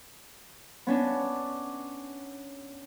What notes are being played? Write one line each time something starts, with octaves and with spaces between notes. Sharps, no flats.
B3 C#4 D4